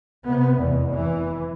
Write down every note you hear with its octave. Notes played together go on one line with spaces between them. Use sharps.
C3 B3
F1 E2
E3